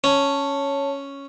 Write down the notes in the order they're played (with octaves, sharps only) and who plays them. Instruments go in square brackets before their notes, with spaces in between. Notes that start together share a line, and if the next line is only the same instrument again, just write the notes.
[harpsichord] C#4 [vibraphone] C#5 A5